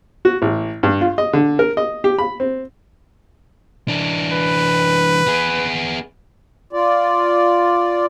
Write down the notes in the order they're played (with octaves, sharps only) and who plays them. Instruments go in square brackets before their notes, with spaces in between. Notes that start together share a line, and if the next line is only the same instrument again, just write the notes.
[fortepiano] F#4
A1
G2
F4
D#5
D3
A#4
D#5
G4
B5
C4
[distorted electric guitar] E3 D4
[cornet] B4
[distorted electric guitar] B3 G#4
[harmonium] F4 D5